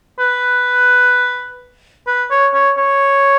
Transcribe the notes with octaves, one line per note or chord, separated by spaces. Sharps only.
B4
B4
C#5
C#5
C#5